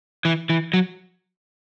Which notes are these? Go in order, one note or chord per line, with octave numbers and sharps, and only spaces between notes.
E3
E3
F#3